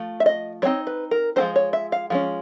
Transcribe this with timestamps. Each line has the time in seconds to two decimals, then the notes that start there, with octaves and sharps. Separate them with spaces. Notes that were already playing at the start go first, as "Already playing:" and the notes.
Already playing: F3 A3
0.20 E5
0.26 D#5
0.62 G3 C4 D#4 C#5
0.87 B4
1.11 A#4
1.36 F3 G#3 C4 D#4 C5
1.56 C#5
1.73 E5
1.92 F5
2.10 F3 G#3 C#4